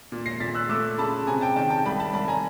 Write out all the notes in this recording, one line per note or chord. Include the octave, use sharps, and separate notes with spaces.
A#2
A#6 C7
A#2 A6 B6
E6 F#6
A3 D6 E6
C#3 A5 B5
C3 G#5 A#5
G5 A5
D#3 G5 A5
G5 A5
C2 A5 B5
A5 B5
C2 A5 B5
G#5 A#5